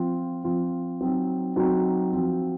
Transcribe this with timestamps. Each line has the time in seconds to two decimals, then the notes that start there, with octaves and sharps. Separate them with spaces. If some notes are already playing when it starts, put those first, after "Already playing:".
Already playing: F3 C4 F4
0.44 F3 C4 F4
1.01 F#3 C4 D#4 F#4
1.56 F#3 C4 D#4 F#4
2.12 F3 C4 F#4